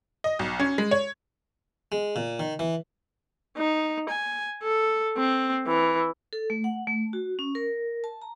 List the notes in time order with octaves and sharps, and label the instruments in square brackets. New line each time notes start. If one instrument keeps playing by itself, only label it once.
[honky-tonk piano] D#5
B1
C#4
G#3
C#5
[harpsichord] G#3
A#2
D#3
E3
[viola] D#4
G#5
A4
C4
E3
[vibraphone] A4
A3
F#5
A3
F#4
C#4
A#4
A5
A#5